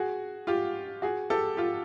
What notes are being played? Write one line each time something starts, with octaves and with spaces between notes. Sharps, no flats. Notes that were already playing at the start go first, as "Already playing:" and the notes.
Already playing: F#4 G#4
F4 G4
F#4 G#4
G4 A4
F4 G4